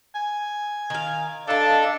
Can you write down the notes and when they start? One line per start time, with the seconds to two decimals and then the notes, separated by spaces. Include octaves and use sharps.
0.15 G#5
0.90 D#3 F5
1.47 D4 A4 D#5 F5 G5 A5